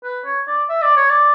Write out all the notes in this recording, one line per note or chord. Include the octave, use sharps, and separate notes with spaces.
B4
C#5
D5
E5
D5
C#5
D5